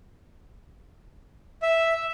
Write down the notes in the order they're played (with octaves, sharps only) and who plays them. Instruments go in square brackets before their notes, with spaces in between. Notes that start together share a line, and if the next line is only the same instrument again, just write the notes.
[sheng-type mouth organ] E5